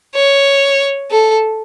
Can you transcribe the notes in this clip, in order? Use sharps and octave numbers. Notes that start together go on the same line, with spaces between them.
C#5
A4